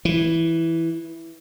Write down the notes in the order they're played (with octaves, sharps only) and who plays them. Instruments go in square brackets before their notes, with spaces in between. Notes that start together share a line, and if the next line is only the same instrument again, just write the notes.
[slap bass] E3